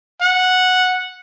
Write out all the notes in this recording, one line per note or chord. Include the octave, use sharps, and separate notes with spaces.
F#5